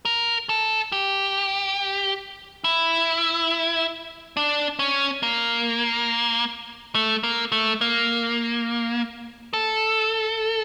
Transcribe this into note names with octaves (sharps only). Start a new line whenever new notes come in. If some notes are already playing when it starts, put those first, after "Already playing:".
A#4
A4
G4
E4
D4
C#4
A#3
A3
A#3
A3
A#3
A4